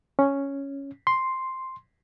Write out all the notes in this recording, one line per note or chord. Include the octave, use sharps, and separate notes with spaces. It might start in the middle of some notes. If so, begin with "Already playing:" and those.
C#4
C6